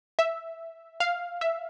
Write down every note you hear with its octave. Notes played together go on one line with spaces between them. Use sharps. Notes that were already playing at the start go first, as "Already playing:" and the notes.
E5
F5
E5